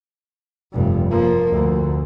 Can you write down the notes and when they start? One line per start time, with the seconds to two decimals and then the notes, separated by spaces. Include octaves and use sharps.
0.72 F1 G2
1.10 F3 A#3
1.53 D2